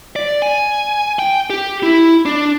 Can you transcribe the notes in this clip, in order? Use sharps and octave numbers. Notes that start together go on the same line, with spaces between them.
D5
G#5
G5
G4
E4
D4